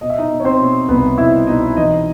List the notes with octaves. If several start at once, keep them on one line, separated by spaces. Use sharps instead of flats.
B2 D#5
E5
D#4 D#5
B2
C#5
C4 C5
B2
C2 B3 B4
C2 E4 E5
B2 D#4 D#5
E3 D#4 D#5